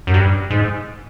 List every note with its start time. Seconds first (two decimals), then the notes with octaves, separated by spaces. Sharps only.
0.07 F#2
0.14 G2
0.50 G#2